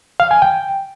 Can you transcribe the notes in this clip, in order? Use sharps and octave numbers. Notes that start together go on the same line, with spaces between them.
F5
G#5
G5